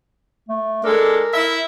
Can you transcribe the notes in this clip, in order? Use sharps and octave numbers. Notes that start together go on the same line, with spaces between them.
A3
G#3 D4 A4 A#4
E4 E5